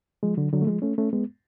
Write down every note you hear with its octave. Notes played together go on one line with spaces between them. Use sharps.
F3 G#3
D3 F#3
D3 F#3
A3
F3 G#3
A3 C#4
A3 C#4
G#3 B3